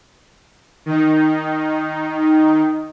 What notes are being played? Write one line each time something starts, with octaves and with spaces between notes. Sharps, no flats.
D#3 D#4